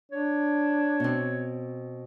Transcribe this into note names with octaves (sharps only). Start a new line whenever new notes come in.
D4 C#5
B2 C4